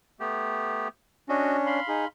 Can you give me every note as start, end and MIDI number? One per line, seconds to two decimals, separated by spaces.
0.20 0.88 57
0.20 0.88 59
0.20 0.88 67
1.29 1.80 61
1.29 1.80 62
1.29 1.57 66
1.29 1.57 75
1.66 2.08 77
1.66 2.08 83
1.66 2.08 84
1.88 2.05 63
1.88 2.05 68